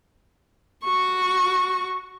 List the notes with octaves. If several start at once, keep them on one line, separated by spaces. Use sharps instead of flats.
F#4 C#6